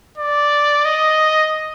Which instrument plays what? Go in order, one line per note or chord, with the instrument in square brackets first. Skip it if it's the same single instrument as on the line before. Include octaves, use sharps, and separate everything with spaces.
[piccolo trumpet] D5
D#5